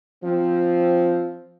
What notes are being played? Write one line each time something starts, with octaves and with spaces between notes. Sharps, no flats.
F3 C4